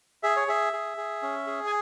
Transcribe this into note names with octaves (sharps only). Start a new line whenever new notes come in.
G#4 E5
C#5
G#4 E5
G#4
G#4
C#4
G#4
G#5